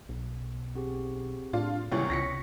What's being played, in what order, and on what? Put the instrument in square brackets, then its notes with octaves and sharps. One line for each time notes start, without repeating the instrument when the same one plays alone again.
[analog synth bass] B1
[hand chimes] C4 G4 G#4
[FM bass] A2 [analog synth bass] D4 [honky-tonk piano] F4
[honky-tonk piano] G#1 C#2 E3 [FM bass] C3 [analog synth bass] G3 [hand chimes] B3 C#5 C#6
[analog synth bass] C#2 [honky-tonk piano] A#6 B6 C#7